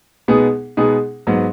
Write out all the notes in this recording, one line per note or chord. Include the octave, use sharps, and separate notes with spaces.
B2 G#3 B3 D#4 G#4
B2 G#3 B3 D#4 G#4
G#2 F#3 B3